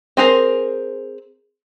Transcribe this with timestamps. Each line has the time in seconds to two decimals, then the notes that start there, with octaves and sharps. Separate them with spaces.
0.17 C4 G#4 A#4 C5